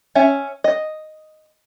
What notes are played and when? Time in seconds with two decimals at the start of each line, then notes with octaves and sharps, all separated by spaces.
0.15 C#4 E5 G#5
0.64 D#5